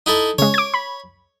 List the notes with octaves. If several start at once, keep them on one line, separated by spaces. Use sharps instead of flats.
D#4 E4 A4
C#3 G#3 C#5
D6 G#6
B5